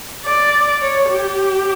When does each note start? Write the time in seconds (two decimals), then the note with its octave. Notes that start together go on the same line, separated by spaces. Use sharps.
0.25 D5
0.82 C#5
1.10 G4